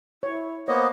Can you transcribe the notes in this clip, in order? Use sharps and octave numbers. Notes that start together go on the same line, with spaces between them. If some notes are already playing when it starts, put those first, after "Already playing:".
E4 C#5
A#3 B3 C5 C#5 D#5